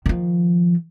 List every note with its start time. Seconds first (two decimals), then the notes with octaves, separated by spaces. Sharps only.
0.06 D#3 F3